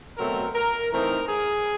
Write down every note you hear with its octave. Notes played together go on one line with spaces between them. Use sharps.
B2 F#3 A3 C4 A#4
A#4
E3 A3 C4 D#4 A#4
G#4